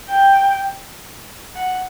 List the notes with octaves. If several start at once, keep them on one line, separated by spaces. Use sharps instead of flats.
G5
F#5